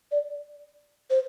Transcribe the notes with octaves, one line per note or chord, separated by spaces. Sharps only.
D5
C5